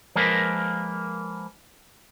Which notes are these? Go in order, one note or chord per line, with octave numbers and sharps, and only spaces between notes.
F3 G#3 A#3 A#4 B4